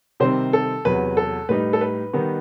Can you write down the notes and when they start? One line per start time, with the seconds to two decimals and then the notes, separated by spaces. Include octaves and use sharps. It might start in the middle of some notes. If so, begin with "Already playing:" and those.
0.20 C3 D#3 G3 C4 C5
0.53 A4
0.85 E2 C3 F#3 B4
1.17 A4
1.49 A2 G3 D#4 B4
1.73 A4
1.81 B4
2.13 D#3 G3 B3 D#4